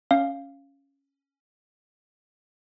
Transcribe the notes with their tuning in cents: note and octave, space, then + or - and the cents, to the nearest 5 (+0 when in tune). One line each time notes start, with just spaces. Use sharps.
C#4 +0 F5 -5